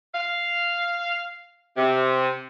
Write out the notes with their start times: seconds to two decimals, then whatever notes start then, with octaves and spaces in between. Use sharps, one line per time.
0.15 F5
1.77 C3